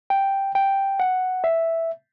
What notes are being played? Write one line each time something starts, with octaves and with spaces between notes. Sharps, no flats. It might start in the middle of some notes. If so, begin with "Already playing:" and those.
G5
G5
F#5
E5